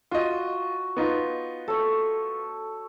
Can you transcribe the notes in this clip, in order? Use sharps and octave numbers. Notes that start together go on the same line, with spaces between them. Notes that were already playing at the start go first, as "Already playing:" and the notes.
F4 F#4 D#5
B3 D#4 F4
A4 C#5